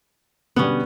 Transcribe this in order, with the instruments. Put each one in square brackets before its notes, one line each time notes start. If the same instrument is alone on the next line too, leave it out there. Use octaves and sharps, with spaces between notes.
[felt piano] B2 D3 G3 [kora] B3 C#4